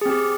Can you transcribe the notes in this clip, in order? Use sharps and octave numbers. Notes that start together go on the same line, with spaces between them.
C4 G4 G#4